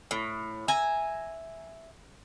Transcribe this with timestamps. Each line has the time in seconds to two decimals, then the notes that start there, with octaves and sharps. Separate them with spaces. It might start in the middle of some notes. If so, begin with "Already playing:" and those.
0.11 A2
0.68 E5 G#5 A#5